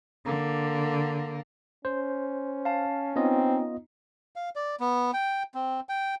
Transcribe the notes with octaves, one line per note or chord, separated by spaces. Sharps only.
D3 A#3
C#4 C5
F5 A5
B3 C4 D#4 F4 D#5
F5
D5
B3
G5
C4
G5